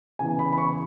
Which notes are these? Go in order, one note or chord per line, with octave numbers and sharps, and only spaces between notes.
C#3 E3 B3 E4 G#5
B5
B5
C#6